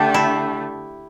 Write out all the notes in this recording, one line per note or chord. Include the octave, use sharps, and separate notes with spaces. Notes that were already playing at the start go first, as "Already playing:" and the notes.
Already playing: D3 A3 D4 G4
E4